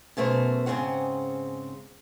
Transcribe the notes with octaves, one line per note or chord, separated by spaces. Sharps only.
F#2 B2 A3 A#4 C5
G#2 C#3 F#3 C4 G#4 F#5